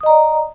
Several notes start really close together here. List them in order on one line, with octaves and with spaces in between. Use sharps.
D#6 D#5 A#5 D5